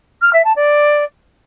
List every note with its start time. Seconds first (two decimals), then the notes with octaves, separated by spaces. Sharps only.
0.22 F6
0.33 E5
0.44 A5
0.56 D5